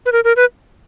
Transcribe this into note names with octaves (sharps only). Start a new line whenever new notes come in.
B4
A#4
A#4
B4